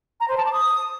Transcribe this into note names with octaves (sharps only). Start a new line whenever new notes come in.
A#5
C5
A5
D6
D#6